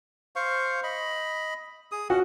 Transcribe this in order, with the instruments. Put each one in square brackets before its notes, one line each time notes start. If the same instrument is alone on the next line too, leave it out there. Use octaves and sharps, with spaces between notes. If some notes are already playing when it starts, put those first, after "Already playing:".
[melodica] C5 F5 C#6
D#5 B5
G#4 D#6
[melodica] C#4 F#5 [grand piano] F#4